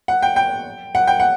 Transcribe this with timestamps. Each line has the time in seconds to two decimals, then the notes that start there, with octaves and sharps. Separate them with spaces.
0.08 F#5
0.23 G5
0.36 G5
0.95 F#5
1.07 G5
1.20 F#5